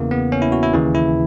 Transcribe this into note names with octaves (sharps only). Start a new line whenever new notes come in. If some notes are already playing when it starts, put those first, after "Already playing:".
Already playing: E2 C#3 E3 A#3
B3
C#4
E4
F#4
E4
D#2 C#3 E3
E4